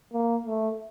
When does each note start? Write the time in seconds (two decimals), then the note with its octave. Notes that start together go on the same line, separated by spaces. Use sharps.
0.13 A#3
0.46 A3